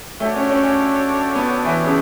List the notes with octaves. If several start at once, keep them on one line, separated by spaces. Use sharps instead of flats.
A3 D4 F#4 A4 C#5 G5
C#4
C#4
C#4
B3
E3
C#3